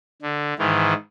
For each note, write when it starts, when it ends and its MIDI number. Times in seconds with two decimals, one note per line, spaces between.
0.22 0.54 50
0.59 0.94 44
0.59 0.94 51
0.59 0.94 52